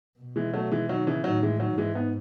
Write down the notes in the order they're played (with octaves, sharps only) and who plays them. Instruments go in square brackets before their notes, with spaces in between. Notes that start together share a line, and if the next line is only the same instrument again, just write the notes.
[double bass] B2
[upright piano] E3 G#3
F#3 A3
E3 G#3
D#3 F#3
C#3 E3
[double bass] A2 [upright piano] D#3 F#3
[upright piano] E3 G#3
D#3 F#3
[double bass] G#2 [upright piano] E3 G#3
[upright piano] B3 D#4